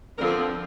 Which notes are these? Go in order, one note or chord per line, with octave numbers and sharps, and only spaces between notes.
D3 F3 C4 A#4